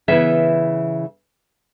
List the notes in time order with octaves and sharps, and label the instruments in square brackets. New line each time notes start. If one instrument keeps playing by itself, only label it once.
[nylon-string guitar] C#3 E3 B3 E4 E5